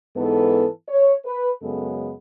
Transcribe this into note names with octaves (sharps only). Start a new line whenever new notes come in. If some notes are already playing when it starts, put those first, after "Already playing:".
G#2 E3 B3 A4
C#5
B4
F#2 C#3 G#3 B3 A4